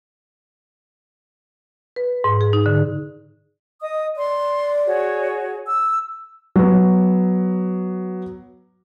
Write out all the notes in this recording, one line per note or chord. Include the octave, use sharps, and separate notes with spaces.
B4
G#2
G#4
D#4
D3
D#5 D#6
D5 C6
F#4 G#4 C#5
E6
F#3 B3